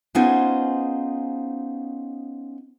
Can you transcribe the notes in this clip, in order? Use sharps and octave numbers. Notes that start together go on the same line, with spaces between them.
B3 C#4 D#4 F4 G#4 C5